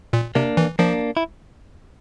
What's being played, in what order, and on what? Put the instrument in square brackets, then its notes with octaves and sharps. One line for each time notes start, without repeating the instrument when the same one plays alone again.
[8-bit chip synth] A#2
[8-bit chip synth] C3 [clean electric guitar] A#3 D4
[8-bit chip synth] E3
[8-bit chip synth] F3 [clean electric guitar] A#3 D4
[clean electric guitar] E4